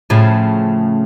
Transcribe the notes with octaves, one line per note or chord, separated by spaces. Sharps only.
A2 C#3 F3